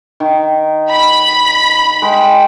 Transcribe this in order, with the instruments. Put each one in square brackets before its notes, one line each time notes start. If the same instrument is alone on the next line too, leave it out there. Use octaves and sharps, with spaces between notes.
[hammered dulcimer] D#3
[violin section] B5
[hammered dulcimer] G#3 G5 C6